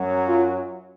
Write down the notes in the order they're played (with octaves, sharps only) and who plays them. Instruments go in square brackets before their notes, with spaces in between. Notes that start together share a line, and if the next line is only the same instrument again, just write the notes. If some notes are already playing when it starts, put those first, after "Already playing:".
Already playing: [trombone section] F#2 F#3
[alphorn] F4